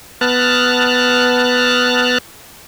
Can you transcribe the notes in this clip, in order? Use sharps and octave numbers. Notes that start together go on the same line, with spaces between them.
B3 A5 F6 F#6